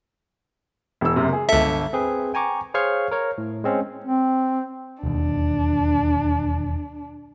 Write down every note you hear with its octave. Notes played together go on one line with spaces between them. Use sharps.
E1 E6
F#1 F#2 C3
G#4
G1 C#2 A4 E5
C4 G#4 B4
G5 G#5 A#5 C#6 D6
G#4 C5 C#5 F5 C#6 F6
A#4 C#5
A2
G#3 C4 C#4
C4
E1 D#2 D4